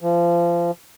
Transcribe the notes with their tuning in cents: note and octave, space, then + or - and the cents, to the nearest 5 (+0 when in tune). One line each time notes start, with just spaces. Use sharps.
F3 -25